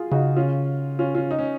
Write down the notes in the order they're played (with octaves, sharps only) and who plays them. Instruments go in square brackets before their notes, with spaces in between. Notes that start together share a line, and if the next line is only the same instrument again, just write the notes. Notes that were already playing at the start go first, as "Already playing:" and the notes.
Already playing: [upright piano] F4 F#4 G#4
[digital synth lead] C#3 [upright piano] D#4 F#4
[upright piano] C#4 F4
C#4 F4
C#4 F4
D#4
C#4